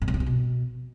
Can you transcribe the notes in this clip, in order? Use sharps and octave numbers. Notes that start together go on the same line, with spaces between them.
A2
G#2
A#2
C3
B2